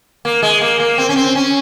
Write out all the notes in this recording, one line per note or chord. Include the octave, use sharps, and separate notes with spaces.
A#3
G#3
A#3
A#3
C4
C#4
C4
C#4